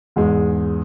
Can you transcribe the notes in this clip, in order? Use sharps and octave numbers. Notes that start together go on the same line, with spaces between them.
E2 G#2 G#3